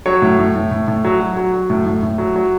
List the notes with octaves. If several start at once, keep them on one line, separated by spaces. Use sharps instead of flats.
F#3 C#5
A2
A2
A2
A2
A2
F#3
F#3
F#3
F#3
A2
A2
A2
F#3
F#3